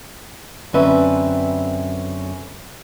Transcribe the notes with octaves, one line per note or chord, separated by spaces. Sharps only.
F#2 D3 C4 C#4 B4 E5